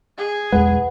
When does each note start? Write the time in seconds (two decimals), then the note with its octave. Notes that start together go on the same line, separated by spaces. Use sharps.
0.18 G#4
0.52 B1 E2 G#3 B4 F#5